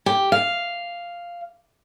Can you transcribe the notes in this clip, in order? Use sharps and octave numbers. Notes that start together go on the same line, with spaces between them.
G4
F5